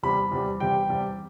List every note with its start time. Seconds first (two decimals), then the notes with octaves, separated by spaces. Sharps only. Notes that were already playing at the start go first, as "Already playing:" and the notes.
0.03 E2 C3 G3 B5
0.32 E2 C3 G3
0.60 E2 C3 G3 G5
0.89 E2 C3 G3